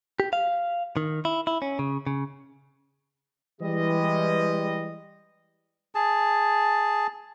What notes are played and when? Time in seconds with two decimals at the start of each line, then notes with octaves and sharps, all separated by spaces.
0.20 G4
0.33 F5
0.97 D#3
1.25 E4
1.47 E4
1.62 C#4
1.79 C#3
2.07 C#3
3.62 E3 G3 G#3 D#5
5.95 G#4 A5